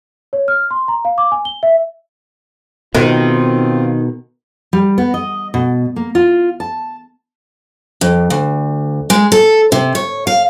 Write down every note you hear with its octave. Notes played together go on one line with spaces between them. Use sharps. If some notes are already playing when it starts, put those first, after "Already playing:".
C#5
F6
C6
A#5
F5
D6
G#5
G7
E5
B2 D#3 C4 F4
G3
B3
D#5
B2
A#3
F4
A5
F2
D2
G#3
A4
C3
C#5
F5